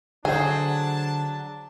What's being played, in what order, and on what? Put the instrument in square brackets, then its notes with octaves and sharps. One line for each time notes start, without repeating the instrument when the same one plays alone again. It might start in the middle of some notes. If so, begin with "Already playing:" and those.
[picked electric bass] D3 [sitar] F#3 F#4 C5 [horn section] D4 A5 [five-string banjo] G#4